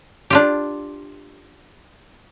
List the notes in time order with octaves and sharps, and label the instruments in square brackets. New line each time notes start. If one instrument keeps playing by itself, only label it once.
[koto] D4 F4 G4